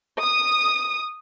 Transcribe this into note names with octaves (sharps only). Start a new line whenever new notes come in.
D#6